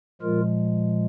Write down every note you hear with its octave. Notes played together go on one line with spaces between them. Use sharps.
A#2 F3 G#3 F4 A#4